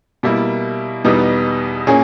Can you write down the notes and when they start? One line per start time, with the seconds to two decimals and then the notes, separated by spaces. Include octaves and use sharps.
0.23 B2 G3 A#3 E4 A#4
1.04 E2 B2 G3 B3 D#4
1.87 A#2 A#3 C#4 G#4